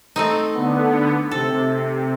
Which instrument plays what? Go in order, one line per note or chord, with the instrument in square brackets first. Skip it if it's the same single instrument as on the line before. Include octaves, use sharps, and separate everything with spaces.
[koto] A3 C4 D#4
[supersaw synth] D3 B3
[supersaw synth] C3 [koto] A4